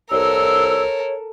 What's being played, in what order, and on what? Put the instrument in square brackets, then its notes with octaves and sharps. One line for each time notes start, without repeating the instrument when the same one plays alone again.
[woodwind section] C2 E6 [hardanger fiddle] A4 A#4 [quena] C#5